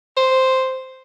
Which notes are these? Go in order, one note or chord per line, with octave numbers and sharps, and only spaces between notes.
C5